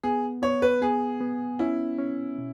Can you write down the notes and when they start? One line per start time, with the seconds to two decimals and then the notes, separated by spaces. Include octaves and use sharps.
0.03 B3 G#4
0.42 B3 C#5
0.62 B4
0.82 B3 G#4
1.20 B3
1.59 C#4 E4
1.99 C#4
2.38 B2